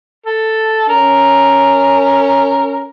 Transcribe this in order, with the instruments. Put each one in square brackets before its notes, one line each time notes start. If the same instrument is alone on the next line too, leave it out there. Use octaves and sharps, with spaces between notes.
[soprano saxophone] A4
[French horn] C#4 [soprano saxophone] A#4